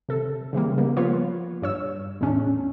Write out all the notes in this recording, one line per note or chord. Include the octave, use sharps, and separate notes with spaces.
C3 A4
C#3 E3 G3 A#3
G3 A#3 B3
F3 F4 B4 C#5
G2 C#5 E6
E2 A2 C#4 D4